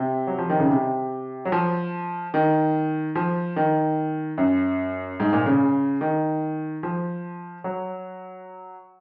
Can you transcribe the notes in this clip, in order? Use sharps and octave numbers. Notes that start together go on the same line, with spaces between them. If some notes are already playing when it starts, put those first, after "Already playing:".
Already playing: C3
F#3
F3
D#3
C#3
C3
F#3
F3
D#3
F3
D#3
F#2
G#2
A#2
C#3
D#3
F3
F#3